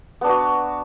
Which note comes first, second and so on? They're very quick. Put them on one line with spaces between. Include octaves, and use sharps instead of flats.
B3 D4 B4 F#4